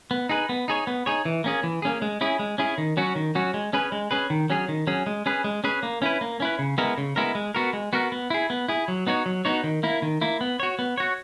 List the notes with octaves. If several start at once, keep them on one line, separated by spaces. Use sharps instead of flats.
B3
D#4 G#4 B4
B3
D#4 G#4 C#5
B3
D#4 G#4 C#5
E3
A#3 C#4 G#4
E3
A#3 C#4 G#4
G#3
C#4 E4 G#4
G#3
C#4 E4 G#4
D#3
F#3 C#4 F#4
D#3
F#3 C#4 F#4
G#3
C#4 G#4 B4
G#3
C#4 G#4 B4
D#3
F#3 C#4 G#4
D#3
F#3 C#4 G#4
G#3
C#4 G#4 B4
G#3
C#4 G#4 B4
A#3
C#4 E4 B4
A#3
C#4 E4 B4
C#3
G#3 B3 E4 A#4
C#3
G#3 B3 E4 A#4
G#3
B3 F#4 A#4
G#3
B3 F#4 A#4
B3
E4 G#4
B3
E4 G#4
F#3
B3 D#4 F#4 C#5
F#3
B3 D#4 F#4 C#5
D#3
A#3 E4
D#3
A#3 E4
B3
F#4 C#5
B3
F#4 C#5